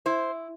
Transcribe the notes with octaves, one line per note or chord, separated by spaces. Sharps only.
E4 C5